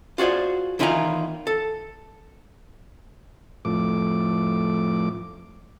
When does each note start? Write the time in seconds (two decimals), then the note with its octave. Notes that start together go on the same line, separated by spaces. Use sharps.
0.18 F4 F#4 G#4 C5 D5
0.79 E2 D#3 E4 F4 G#5 A#5
1.47 A4
3.65 F2 A2 D6